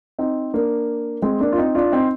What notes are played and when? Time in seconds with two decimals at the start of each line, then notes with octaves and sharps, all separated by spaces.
0.19 C4 D#4
0.53 A#3 D4
1.22 G#3 C4
1.40 A#3 D4
1.52 F4
1.58 C4 D#4
1.75 D4 F4
1.92 C4 D#4